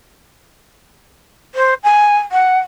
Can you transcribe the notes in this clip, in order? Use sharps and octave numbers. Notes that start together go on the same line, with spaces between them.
C5
G#5
F#5